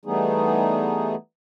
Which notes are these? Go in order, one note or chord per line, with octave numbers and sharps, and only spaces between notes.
E3 G3 A3 B3 D#4 G#4